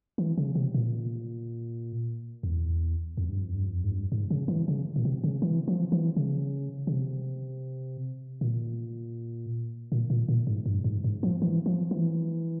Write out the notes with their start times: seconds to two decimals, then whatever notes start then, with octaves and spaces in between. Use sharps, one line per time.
0.18 E3
0.38 C#3
0.55 C3
0.74 A#2
2.43 E2
3.17 F2
3.29 G2
3.42 F2
3.54 G2
3.66 F2
3.84 G#2
3.93 G2
4.12 G#2
4.31 C#3
4.48 E3
4.68 C#3
4.96 A#2
5.05 C3
5.24 C#3
5.42 E3
5.68 F3
5.92 E3
6.17 C#3
6.87 C#3
6.92 C3
8.41 A#2
9.92 A#2
10.10 A#2
10.28 A#2
10.47 G#2
10.66 G2
10.84 G#2
11.04 G#2
11.23 F3
11.42 E3
11.66 F3
11.91 E3